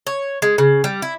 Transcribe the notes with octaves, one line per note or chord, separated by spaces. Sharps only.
C#5
G#3
C#3
G3
E4